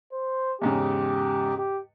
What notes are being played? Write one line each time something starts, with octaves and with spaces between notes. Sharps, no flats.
C5
E2 G#2 C#3 G4
G4